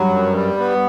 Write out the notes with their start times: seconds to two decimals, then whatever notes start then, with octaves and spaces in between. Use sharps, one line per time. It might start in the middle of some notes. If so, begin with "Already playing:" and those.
Already playing: G2 F#3
0.09 F#2
0.33 G3
0.57 B3